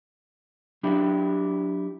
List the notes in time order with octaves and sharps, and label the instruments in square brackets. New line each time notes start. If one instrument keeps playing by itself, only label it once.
[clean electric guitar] F#3 D4 E4 G4